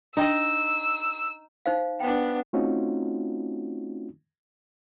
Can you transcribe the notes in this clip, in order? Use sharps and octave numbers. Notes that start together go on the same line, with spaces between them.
D4 D#4 D#5 G5 A#5 E6
D#4 C5 F5
B3 D4 G5
A3 C4 C#4 D#4 F4 F#4